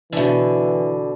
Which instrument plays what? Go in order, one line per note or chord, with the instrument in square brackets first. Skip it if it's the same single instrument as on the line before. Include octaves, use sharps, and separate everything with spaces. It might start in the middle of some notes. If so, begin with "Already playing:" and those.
[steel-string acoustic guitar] B2 D3 [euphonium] E3